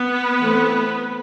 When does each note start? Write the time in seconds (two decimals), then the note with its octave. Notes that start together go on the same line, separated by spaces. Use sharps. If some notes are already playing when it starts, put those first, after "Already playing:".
Already playing: B3 B4
0.40 E3 A3 C4